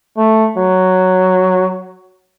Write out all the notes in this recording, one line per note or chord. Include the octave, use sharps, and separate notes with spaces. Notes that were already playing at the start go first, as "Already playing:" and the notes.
A3
F#3